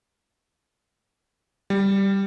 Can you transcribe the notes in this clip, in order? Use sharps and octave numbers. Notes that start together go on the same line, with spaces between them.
G3